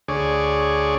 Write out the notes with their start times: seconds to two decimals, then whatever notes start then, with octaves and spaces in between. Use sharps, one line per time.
0.08 D2 G#4 C#5 D5